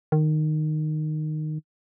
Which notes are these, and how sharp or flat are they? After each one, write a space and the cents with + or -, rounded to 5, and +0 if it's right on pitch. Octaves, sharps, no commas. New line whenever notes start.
D#3 -15